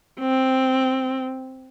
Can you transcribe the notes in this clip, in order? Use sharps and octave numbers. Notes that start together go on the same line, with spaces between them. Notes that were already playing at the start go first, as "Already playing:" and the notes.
C4